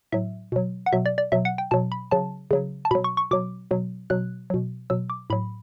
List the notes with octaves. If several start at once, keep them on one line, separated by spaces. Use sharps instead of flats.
A2 F#3 E5
B2 F#3
F#5
B2 F#3 E5
D5
D5
B2 F#3 E5
F#5
G5
B2 F#3 A5
B5
C#3 F#3 A5
C#3 F#3
A5
B2 F#3 B5
C#6
C#6
B2 F#3 D6
B2 F#3
B2 F#3 F#6
B2 F#3
B2 F#3 E6
D6
A2 F#3 B5